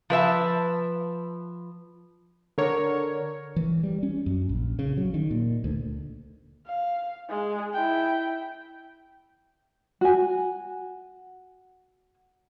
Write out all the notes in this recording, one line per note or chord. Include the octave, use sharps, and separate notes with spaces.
F3 B4 E5 A5
D3 A#4 C#5
E3
G3
C#4
F#2
A#1
C#3
F#3
D#3
A#2
D2
F5
G#3
E4 G5
F#4 G#5